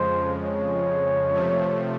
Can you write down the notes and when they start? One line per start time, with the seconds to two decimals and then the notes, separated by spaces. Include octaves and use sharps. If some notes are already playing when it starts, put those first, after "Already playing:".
Already playing: F2 C#3 F3 G#3 C5
0.46 C#5
1.33 C3 F3 A3